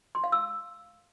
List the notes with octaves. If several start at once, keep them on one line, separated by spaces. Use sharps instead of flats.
C6
F5
E6